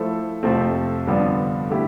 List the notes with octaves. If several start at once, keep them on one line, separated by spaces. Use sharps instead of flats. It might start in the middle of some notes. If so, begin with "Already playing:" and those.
Already playing: F3 A3 E4 A4 C5
F2 C3 F3 A3 C4
G2 D3 F3 B3 D4
D3 A3 E4 G4